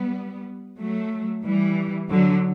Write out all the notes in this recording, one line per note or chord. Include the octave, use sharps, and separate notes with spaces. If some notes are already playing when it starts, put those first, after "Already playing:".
Already playing: G3 B3
F#3 A3
E3 G3
D3 F#3